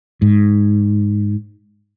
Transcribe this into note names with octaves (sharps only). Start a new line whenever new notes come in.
G#2